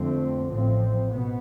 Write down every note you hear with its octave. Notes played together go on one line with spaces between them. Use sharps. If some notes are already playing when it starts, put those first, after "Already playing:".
Already playing: F2 D3 A3 C4
A1 A2 F3 C4
B2 B3